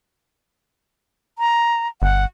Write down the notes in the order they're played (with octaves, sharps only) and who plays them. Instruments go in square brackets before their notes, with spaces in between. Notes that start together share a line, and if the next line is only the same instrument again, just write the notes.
[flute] A#5
[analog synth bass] G1 [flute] F#5